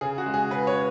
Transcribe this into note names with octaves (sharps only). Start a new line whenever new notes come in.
C#3 G#4
F#4
G#3
G#4
C#3 B4
C#5